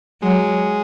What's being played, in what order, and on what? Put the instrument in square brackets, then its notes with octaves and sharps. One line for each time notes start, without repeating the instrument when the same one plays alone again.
[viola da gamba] F#3 [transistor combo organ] G#3